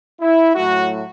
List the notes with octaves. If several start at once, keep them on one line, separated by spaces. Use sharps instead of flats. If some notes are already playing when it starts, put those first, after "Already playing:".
E4
A2 F#3 A3 F#4